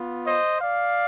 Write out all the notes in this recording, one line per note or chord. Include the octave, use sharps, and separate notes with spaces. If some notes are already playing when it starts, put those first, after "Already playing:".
Already playing: B3 F4
C5 D#5
D5 F5